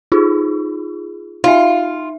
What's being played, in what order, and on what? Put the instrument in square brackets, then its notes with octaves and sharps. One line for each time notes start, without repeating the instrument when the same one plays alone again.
[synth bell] D#4 F4 G#4
[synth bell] D#4 E5 [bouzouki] F4